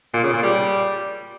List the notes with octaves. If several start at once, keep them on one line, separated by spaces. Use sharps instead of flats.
A#2
C#3
A#2
G3